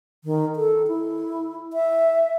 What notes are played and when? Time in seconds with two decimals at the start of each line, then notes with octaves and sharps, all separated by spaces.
0.24 D#3
0.56 A4
0.87 E4
1.73 E5